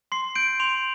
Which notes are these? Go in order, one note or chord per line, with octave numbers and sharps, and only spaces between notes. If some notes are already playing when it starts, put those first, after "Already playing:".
C6 C7
G6 D7
C6 F7